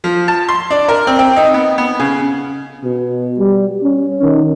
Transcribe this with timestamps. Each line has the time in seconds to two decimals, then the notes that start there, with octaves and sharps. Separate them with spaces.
0.04 F3
0.28 A5
0.49 C6
0.70 D4
0.88 A#4
1.07 C4
1.19 C4
1.36 D#4
1.54 B3
1.78 B3
1.99 C#3
2.84 B2
3.39 G3
3.83 C#4
4.22 D#3